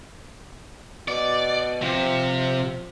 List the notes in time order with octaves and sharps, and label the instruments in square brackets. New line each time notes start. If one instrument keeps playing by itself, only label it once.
[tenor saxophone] B2 [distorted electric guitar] D5
[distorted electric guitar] C3 [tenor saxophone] F3